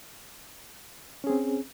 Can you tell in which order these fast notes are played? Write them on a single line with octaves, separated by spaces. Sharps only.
C#4 G#4 C4